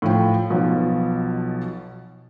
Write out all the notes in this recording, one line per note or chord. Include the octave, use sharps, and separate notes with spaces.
A2 F3 G5
B1 B2 F3